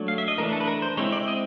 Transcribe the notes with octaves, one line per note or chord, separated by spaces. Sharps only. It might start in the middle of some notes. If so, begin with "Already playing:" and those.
Already playing: F#3 A3 D4
F5
E5
D#5
E3 A3 D4 A#4
A4
B4
A#4
C5
G#3 C4 E4 C#5
D5
D#5